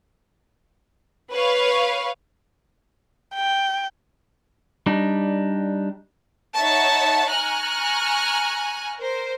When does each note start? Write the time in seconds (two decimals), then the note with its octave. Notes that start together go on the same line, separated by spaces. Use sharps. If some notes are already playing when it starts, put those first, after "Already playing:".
1.32 B4 C#5 F5
3.35 G5
4.86 G3 D4 D#4
6.56 D#4 C#5 E5 F#5 A5 C#6
7.31 G#5 A#5 C#6 F6 F#6
8.99 A#4 C5